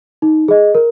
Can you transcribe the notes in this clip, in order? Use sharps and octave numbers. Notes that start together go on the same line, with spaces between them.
D#4
G#4 D#5
A#4